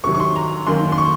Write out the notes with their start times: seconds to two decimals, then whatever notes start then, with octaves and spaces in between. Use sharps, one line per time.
0.04 C3 D#3 F#3 C#6
0.15 C#6
0.20 C6
0.36 A#5
0.67 F#2 D#3 A#3 C6
0.92 C6
0.98 C#6